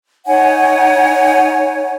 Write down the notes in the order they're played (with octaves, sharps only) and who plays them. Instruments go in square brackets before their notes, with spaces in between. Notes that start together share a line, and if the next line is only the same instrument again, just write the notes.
[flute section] D#4 C#5 F#5 G#5